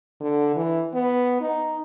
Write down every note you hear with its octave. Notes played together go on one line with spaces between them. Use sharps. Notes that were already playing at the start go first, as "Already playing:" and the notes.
D3
E3
B3
D#4